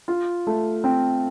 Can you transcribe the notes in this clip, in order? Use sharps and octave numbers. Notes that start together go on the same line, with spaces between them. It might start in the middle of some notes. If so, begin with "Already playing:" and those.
F4
A3
C4